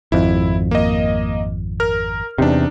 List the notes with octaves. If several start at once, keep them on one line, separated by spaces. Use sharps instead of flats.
G#1 F2 E4
A#3 D#5
A#4 F6
E2 C3 D4 D#4